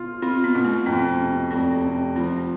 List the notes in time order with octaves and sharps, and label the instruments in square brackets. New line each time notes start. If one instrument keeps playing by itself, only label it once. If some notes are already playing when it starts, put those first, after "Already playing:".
Already playing: [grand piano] B2 F4
[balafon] C4 [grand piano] F4
[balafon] B3
[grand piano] B2
[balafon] A3
[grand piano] F2 [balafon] B3
[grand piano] C3
[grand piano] F1 [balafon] C4
[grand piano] C3
[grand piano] F3 [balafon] C4